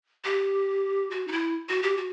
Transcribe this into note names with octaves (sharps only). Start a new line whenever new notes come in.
G4
F#4
D#4
E4
F#4
G4
F#4